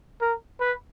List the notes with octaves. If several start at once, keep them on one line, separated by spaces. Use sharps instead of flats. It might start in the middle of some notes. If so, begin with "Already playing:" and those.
A#4
B4